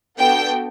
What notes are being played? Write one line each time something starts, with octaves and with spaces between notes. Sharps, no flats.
B3 D4 F#4 A4 G5